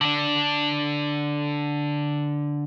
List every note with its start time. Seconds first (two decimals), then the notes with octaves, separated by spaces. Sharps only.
0.01 D3 D4